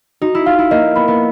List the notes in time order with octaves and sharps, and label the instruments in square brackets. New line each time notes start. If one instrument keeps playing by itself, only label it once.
[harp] D#4 [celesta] F#4
[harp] E4
[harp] F4 [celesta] F5
[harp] E4
[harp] A#3 [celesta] D#5
[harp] B3 [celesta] B5
[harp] B3